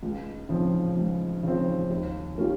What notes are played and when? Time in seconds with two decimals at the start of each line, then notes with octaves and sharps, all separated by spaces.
0.03 C#2
0.49 C#3 F3 C4
0.97 C#2
1.43 C#3 F3 C4
1.90 D#2
2.37 D#3 A#3 C#4 G4